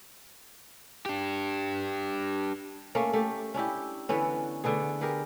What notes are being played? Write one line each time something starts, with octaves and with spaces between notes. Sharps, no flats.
D4 G4
A3 A#3 C#4
A3 G4
C#4 D4 E4 G4
D3 E3 B3 C#4
D3 A3 B3 G#4
B3 G4 G#4 A#4